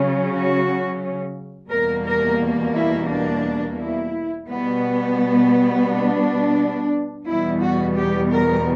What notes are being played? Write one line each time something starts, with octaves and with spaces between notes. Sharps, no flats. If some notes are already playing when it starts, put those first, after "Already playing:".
Already playing: C#3 F#3 C#4
F#4
E2 B2 G3 A#3 A#4
A#4
E4
D4
E4
B2 G3 B3
D4
E2 B2 G3 B3 E4
F#4
G4
A#4